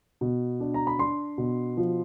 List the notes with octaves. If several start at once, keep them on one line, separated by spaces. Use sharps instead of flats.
B2
D4
A#5
B5
D4 C6
B2
F3